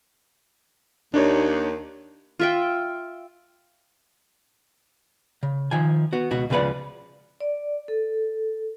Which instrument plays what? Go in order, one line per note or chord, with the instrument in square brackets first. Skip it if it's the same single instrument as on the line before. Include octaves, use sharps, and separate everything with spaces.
[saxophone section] D#2 [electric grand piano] D4 D#4 C#5
[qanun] F4 E5 G5
[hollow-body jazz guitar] C#3
D#3 F3 G#5
B3 F#4
C#2 B2 F#4
C#2 C#3 F3 B4 D5 F#5
[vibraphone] D5
A4